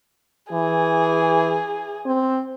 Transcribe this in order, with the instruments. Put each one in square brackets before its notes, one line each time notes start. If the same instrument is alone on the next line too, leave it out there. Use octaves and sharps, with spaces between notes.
[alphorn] E3 [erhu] G#4
[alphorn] C4